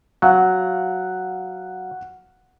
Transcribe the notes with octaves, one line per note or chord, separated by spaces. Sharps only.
F#3 F5 F#5